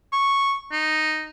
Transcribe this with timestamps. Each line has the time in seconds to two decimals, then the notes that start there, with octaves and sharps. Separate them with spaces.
0.13 C#6
0.72 D#4